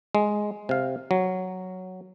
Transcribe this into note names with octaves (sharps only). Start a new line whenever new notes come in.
G#3
C3 F5
F#3